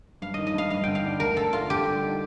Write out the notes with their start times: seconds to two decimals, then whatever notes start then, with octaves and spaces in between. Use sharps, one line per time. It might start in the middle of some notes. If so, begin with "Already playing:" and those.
0.22 G2 F5
0.34 D#3 D#5
0.47 D#5
0.54 G2 F5
0.70 G2 F5
0.84 D3 G5
0.95 F5
1.04 D4
1.20 D2 A#4
1.37 D3 A4
1.53 D4 F4
1.70 D3 G4
1.86 G3
2.03 D#4